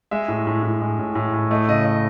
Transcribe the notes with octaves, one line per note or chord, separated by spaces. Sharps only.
G#3 E5
A2
A2
A2
G#3
A2
A2
A2
A3 D#5
C#3 D#5
A3 D#5